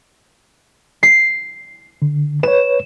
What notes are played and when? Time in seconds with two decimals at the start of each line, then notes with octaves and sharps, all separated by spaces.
1.03 C7
2.02 D3
2.43 B4 C#5 E7